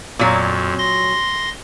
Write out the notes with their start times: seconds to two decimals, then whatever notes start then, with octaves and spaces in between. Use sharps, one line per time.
0.19 F2 A#2 F#3
0.79 C6 A#6